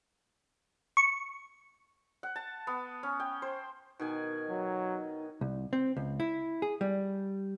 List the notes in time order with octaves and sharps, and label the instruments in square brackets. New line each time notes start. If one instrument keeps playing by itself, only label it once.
[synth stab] C#6
[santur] F#5
A5
B3
C#4
G5
C5
[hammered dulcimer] B2 D#3 G#5 [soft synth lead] D#4
[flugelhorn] F#3
[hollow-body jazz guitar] C2
C4
C#2
E4
G#4
G3